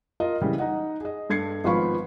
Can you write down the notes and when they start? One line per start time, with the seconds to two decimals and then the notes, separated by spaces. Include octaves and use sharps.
0.20 F4 A#4 D#5
0.41 C#3 E3 G3
0.58 D#4 D#5 F#5
1.01 G#4 D#5
1.29 G2 A4 G#6 C7 C#7
1.64 G#1 F3 B3 F5 B5 C#6